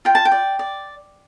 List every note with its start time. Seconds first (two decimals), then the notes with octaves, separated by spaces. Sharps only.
0.05 F4 G5
0.15 A5
0.25 G5
0.32 D5
0.59 D5